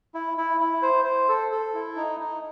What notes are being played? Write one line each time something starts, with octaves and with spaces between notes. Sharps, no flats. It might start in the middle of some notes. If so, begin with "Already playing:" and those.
E4
E4
E4
C5
C5
A4
A4
E4
D#4
D#4